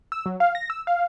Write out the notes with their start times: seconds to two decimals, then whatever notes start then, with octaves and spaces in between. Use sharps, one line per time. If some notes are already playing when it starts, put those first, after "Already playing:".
0.12 E6
0.26 F#3
0.40 F5
0.55 A#6
0.70 E6
0.87 F5